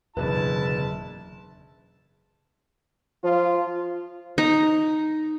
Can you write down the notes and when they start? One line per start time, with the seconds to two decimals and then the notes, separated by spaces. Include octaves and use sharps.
0.17 F#1 E2 B2 D3 E4 B4 A5
3.24 F3 F4
4.38 D#4